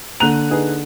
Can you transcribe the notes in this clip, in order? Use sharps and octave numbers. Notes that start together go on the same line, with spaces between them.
D3 A#3 A#5 F#6 D#7 F7
D#4 G#4 B4